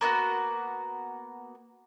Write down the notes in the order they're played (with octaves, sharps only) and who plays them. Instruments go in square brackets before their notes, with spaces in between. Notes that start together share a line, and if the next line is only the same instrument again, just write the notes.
[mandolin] A#3 B3 E4 F#4